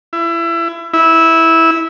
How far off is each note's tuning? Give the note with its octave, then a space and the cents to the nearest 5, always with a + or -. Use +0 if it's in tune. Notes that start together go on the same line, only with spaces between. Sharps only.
E4 +30
E4 -10